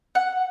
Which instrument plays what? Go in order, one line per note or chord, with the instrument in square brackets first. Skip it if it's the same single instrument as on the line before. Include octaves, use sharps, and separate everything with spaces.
[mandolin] F#5